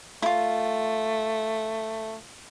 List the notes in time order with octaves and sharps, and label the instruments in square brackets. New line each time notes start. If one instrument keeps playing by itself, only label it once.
[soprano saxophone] A3 [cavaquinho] E4 F4